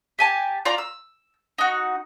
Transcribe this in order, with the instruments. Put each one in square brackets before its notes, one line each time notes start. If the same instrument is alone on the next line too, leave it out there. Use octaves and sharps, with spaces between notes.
[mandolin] G4 G#5 A5
F4 D5 A#5
E6
D#4 F#4